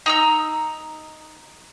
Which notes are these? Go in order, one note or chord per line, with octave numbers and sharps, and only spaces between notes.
D#4 A#5 E6